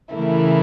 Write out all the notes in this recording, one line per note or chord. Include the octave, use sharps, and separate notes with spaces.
C#3 E3 A3 E4 A#4